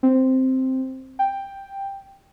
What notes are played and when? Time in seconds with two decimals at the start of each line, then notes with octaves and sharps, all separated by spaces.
0.03 C4
1.19 G5